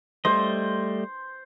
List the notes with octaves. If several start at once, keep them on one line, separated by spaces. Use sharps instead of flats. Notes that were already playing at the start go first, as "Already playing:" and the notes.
G3 A3 C5 D#5